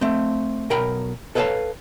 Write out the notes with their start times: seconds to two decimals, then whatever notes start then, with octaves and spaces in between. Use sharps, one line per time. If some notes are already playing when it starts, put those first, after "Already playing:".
0.01 A3 C4
0.70 B1 A#4 G5 A#5 B5
1.35 A4 B4 C#5 D#5 F5 A5